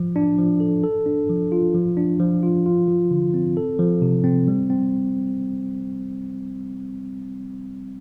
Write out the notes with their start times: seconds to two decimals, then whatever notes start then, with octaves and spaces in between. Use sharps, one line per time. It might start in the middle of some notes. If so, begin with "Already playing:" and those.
Already playing: F3
0.16 D4
0.38 F3
0.60 A4
0.83 A4
1.06 D4
1.29 F3
1.52 F4
1.74 F3
1.97 D4
2.20 F3
2.43 F4
2.66 F4
2.88 F3
3.11 D3
3.34 C4
3.57 A4
3.79 F3
4.02 C3
4.24 C4
4.48 G3
4.70 C4